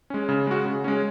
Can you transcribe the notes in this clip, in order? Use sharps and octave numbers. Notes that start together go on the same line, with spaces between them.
G#3 C#4
C#3
G#3 F#4
C#3
G#3 C#4